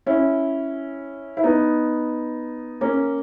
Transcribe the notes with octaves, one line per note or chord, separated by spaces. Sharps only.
C#4 E4
E4
B3 D#4
A#3 C#4